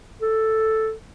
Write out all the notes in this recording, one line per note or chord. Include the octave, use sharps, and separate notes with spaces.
A4